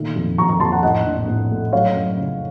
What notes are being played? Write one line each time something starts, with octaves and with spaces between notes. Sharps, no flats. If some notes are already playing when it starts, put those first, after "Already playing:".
Already playing: A#2 D#3 A3
F2
F2 A#5 C#6
A#5 C#6
F2 A5 C6
F#5 A#5
A2 D#5 F#5
A#1
A2
A3
F#3 C#5 F5
F#2
C#3